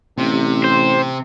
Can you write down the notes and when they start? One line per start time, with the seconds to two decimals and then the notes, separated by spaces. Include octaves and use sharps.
0.18 A1 C3
0.64 C5